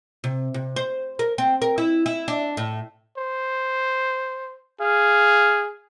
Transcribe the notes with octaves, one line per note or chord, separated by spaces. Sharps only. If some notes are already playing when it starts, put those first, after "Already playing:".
C3
C3
C5
A#4
C4
A#4
E4
E4
D4
A2
C5
G#4 F5